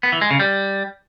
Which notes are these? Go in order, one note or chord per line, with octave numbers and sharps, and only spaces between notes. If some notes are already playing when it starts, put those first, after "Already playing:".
B3
E3
G#3
C#3
G3